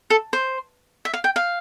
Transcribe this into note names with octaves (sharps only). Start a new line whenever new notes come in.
A4
C5
E5
F5
G5
F5